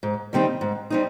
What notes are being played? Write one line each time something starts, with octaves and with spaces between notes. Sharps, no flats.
G#2
D#3 G3 C4 D#4
G#2
G3 C4 D#4